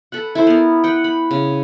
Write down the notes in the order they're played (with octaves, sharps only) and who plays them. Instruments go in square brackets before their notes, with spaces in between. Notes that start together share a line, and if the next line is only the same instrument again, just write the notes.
[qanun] A4 B4 F#5
E4 A4 C5
B3 A#4
B4 F#5 G5
B5
C#3